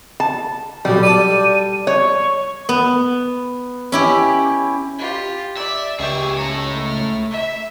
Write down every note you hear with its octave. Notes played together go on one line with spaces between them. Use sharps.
A5
B1 B2 G3
A4 D5 D#7
C#5 C#6
B3
C#4 E4 G4
F4 G4
D5 E5
C#2 G4 G#4 C#6 E6
A3 C#5 A#5
F6
E5